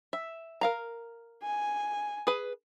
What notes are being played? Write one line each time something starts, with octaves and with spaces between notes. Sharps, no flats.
E5
A#4 F5 A#5
G#5
G#4 B4